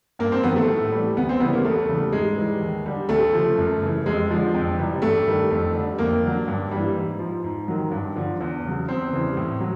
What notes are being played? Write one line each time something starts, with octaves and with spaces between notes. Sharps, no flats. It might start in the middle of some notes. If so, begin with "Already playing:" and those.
G2 A#3
C4
D#3 F#3 B3
A3
A2
E3 G3
D2 B3
C4
C#3 E3 G3 B3
A#3
E2 A3
C#3 E3 G3
G#2 G#3
E3 G3
D#2
D3 G3
D2 A3
C#3 F3
F#2
C#3 E3
F2 G#3
D3 F3
F2
C3 E3 G3
G2 A3
D#3 G3
F2
D3 G3
F2 A#3
D3 F#3
G2
E3 G3
G#2
F3
G#2
D#3 F#3
G2
D3 F3
E2
C#3 F#3
E2 C4
C#3 E3 G3
A2
F#3